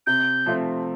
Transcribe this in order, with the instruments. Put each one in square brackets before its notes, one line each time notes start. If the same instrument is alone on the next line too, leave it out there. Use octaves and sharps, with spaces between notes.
[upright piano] C3 [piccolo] G6
[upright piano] F3 A3 C4